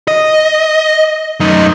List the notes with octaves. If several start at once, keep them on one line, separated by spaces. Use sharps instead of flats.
D#5
F#2 D#4